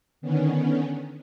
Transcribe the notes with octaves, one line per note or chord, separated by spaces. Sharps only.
D3 D#3 B3 C#4